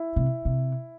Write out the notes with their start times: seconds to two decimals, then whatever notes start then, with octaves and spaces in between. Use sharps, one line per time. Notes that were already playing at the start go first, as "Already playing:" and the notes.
Already playing: E4
0.16 C3
0.45 C3